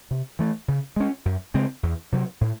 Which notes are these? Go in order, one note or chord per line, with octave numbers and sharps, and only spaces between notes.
C3
E3 A3
C#3
G#3 C#4
F#2
C#3 G#3 C4
E2
C3 F#3
A2